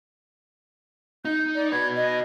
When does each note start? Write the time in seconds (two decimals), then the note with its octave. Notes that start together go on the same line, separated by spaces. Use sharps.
1.25 D#4 G6
1.55 D5
1.72 F#4 B4 G#6
1.95 D#5